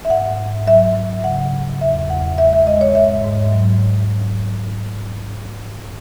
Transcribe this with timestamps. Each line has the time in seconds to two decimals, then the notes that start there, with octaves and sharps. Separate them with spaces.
0.05 E5
0.10 G#2 F#5
0.38 G#2
0.67 F#3 E5
0.95 F#3
1.24 C#3 F#5
1.53 C#3
1.81 E2 E5
2.10 E2 F#5
2.38 G#3 E5
2.53 E5
2.67 G#3 D#5
2.81 C#5
2.95 G#2 E5
3.24 G#2
3.52 F#3